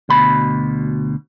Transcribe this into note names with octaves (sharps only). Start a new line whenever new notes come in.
D2 B2 B5